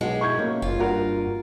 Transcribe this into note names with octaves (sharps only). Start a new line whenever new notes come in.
B1 B2 G#3 F#4 G4
E4 C#6 G6 G#6
A#3 C#4
F#1 F4
G2 F#4 A#4